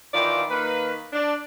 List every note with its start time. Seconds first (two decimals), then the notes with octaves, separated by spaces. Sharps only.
0.14 D#3 E3 F4 D5 G5
0.50 D#3 A#3 B4
1.13 D4